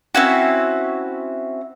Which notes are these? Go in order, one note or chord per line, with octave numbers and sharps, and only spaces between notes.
C4 C#4 E4 F#4